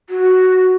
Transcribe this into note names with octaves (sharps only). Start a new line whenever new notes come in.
F#4